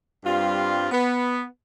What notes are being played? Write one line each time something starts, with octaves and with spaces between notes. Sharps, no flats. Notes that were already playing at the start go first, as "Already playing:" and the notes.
G2 G3 C4 F4
B3